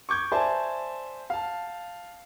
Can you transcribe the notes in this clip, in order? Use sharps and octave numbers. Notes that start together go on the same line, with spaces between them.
C#6 D6 G6 G#6
C5 D5 E5 G#5 A5
F5 A5